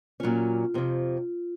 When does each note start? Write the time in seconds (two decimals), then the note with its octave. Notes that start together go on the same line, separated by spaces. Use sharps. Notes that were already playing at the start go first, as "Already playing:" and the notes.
0.20 A#2 F#3 C#4 F4
0.74 F2 C3 F3